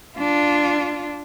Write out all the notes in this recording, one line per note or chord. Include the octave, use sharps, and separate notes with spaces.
D4 F4